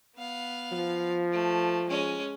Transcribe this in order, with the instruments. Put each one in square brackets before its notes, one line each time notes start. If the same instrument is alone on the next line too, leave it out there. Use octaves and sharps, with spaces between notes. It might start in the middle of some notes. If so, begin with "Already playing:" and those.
[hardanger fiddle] B3 F5
[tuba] F3
[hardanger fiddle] A3
G#3 C#4